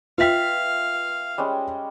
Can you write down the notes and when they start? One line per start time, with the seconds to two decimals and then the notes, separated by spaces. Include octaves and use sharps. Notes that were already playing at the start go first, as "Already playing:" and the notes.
0.18 F4 B4 E5 F5 G5 B6
1.38 G3 G#3 C#4